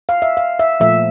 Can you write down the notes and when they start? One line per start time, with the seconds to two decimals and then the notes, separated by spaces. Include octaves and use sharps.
0.09 F5
0.22 E5
0.37 F5
0.59 E5
0.80 A#2 F3 A3 E5